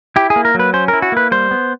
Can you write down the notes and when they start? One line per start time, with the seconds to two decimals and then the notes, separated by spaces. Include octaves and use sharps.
0.16 E4 G4
0.30 G#4
0.36 A#3
0.45 A#4
0.55 F#3 B4
0.73 C#4 C5
0.88 A#4
0.93 E4
1.02 F#4
1.12 A#3 B4
1.31 G3 C5
1.51 B3